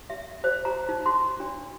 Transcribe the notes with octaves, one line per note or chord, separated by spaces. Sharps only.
E5
C5
A#5
D#4
C6
D4